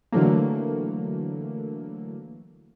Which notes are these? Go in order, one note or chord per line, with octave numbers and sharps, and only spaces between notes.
D3 E3 F#3 A3 A#3